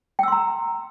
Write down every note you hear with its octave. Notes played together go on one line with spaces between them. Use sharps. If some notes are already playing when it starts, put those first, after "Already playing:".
G5 A#5 C6 E6